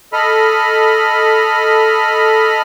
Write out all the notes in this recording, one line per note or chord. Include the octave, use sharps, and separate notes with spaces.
A4 D#5 B5 F6